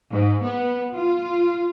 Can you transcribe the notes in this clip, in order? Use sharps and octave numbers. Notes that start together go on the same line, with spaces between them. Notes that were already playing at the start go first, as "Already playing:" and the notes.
G#2
B3
F4